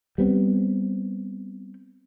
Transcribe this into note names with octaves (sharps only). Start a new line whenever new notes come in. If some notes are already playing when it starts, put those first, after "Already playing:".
G3 B3 C4